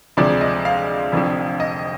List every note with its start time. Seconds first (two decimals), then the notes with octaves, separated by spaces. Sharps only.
0.17 D2 C3 F3 G#3 D5
0.41 D#5
0.65 F5
1.12 F1 F2 D3 F3
1.60 D#5